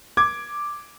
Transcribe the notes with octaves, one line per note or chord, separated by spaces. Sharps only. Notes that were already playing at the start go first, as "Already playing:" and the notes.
D6 G#6